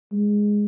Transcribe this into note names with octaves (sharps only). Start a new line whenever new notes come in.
G#3